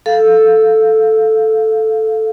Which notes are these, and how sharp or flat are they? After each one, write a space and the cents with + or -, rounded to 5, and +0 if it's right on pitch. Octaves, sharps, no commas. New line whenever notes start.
A4 -5 F5 +0